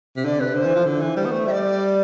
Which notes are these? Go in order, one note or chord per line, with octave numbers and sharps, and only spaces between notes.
C3
D3 D5
C3 B4
D3 C5
E3
F3
D3
E3
G3 C5
B3
A3
G3 D5 E5